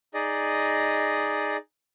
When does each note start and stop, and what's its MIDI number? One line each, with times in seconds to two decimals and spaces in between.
0.14 1.57 63
0.14 1.57 68
0.14 1.57 74
0.14 1.57 75